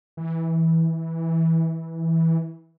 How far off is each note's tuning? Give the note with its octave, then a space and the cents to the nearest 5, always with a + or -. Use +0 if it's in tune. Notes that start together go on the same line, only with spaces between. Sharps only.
E3 -15